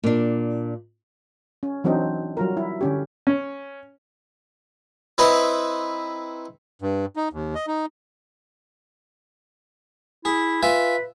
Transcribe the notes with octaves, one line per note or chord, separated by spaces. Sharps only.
A#2 D4
C#4
E3 F#3 C4 D4 D#4
F#3 G3 F4 A#4
E4
D3 C#4 G4
C#4
C4 D#4 E4 B4
G2
D#4
D#2
D#5
D#4
E4 G#4
F4 B4 E5 G#5